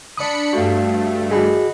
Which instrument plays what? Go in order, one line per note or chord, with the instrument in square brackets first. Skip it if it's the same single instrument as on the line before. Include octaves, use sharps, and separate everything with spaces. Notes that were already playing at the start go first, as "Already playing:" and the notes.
[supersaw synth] D4 B5 C#7 [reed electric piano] D5 D#6
[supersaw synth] G2 A3 [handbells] F#4 F5
[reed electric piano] F#4 G#4 [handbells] D#5 F#5 B5